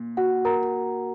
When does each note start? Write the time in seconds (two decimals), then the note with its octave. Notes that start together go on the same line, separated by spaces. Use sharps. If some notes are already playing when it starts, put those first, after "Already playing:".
Already playing: A#2
0.17 F#4 F#5
0.45 A#4 A#5